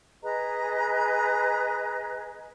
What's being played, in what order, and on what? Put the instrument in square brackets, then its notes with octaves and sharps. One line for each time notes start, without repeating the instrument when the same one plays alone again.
[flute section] G#4 B4 D#5 A#5